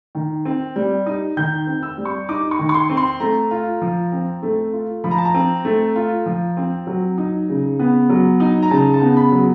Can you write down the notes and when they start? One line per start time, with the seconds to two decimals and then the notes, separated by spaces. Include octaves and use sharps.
0.15 D#3
0.45 C4
0.76 G3
1.06 D#4
1.37 D#3 G6
1.67 C4
1.83 E6
1.98 G3
2.05 C#6
2.29 D#4 D6
2.51 C#6
2.59 D#3
2.69 C#6
2.74 C6
2.90 C4
2.97 C6
3.20 A3 A#5
3.51 F4
3.82 F3
4.12 C4
4.43 A3
4.73 F4
5.04 F3 B5
5.11 A#5
5.18 A5
5.25 A#5
5.34 C4
5.65 A3
5.96 F4
6.26 F3
6.57 C4
6.87 F#3
7.18 D#4
7.49 C#3
7.79 B3
8.10 F#3
8.40 D#4
8.63 A#5
8.71 C#3 A5
8.94 A5
9.02 B3
9.17 B5
9.32 F#3